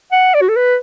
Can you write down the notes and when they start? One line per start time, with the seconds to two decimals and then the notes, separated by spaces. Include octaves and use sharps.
0.12 F#5
0.34 D5
0.41 F#4
0.49 A4
0.56 B4